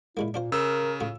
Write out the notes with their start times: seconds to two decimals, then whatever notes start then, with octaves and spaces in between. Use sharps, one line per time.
0.17 A#2 G#3 A#3 E4
0.34 A#2 D4 F4 C5
0.52 C#3 A#4 E6
1.01 A2 F4